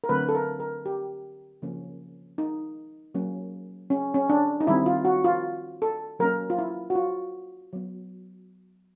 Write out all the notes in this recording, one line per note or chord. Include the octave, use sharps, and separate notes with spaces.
A#4
D3 F#3 A3 C4 B4
A4
A#4
A#4
G4
C#3 F3 A#3 C#4
D#4
F#3 A#3 C#4
C#4
C#4
D4
D#4
D#3 G3 C4 E4
F4
F#4
F4
A4
F#3 A#3 C#4 A#4
F4
E4
F#4
F4
F#3 B3